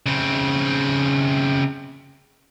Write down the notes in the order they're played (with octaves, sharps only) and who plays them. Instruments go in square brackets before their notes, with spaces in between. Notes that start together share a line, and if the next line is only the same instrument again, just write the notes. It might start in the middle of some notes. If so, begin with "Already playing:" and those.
[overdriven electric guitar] C#3 C4